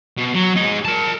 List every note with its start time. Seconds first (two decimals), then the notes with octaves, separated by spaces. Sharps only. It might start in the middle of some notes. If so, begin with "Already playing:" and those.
0.17 B2
0.34 F#3
0.56 G#3 D#4
0.85 A#4 A5